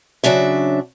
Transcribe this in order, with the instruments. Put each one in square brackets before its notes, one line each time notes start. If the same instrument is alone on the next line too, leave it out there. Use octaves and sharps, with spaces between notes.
[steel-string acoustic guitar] C#3 F#3 D4 E5